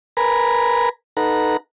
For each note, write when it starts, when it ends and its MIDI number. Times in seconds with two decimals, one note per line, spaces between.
0.17 0.89 70
0.17 0.89 71
0.17 0.89 80
0.17 0.89 82
0.17 0.89 83
1.17 1.57 63
1.17 1.57 69
1.17 1.57 71
1.17 1.57 78
1.17 1.57 82